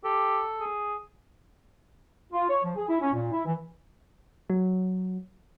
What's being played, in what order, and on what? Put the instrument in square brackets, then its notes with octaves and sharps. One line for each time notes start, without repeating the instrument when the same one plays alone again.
[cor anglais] G4 [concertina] A4
[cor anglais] G#4
[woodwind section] F4
C#5
F3
G#4
E4
C#4
A#2
E4
E3
[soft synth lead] F#3